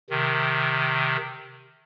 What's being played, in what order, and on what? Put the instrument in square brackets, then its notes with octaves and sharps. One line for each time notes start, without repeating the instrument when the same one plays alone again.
[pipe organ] C3 D#3